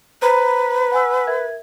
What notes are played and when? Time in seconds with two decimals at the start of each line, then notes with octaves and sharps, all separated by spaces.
0.22 B4 C5 A#5 B5
0.92 F#5 G#5 E6
1.27 A#4 E5 G#6